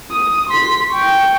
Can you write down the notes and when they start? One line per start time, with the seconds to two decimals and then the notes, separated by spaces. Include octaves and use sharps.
0.12 D#6
0.49 C6 B6
0.92 G5 C#6